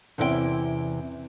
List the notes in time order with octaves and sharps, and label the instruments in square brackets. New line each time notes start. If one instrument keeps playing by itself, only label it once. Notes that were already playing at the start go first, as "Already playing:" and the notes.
[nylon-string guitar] E2 C3 C#4 E4 B4 G5